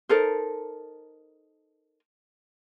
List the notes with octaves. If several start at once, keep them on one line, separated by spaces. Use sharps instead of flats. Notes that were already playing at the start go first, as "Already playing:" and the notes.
D#4 A4 A#4 C5